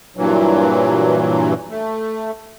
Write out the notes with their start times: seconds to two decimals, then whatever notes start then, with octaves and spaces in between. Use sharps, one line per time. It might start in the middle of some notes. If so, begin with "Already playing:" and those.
0.17 G2 A#2 E3 F#3
1.70 A3